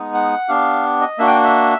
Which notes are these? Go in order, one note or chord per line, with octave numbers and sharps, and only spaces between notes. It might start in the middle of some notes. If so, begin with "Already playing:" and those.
Already playing: G#3 B3 D#4
F#5
B3 D4 G4 F5
D#5
A#3 D4 F#4 E5
G5
E5